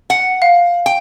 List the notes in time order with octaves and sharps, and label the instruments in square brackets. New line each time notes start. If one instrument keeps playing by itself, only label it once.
[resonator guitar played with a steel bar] F#5
[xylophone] F5
[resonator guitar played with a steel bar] G5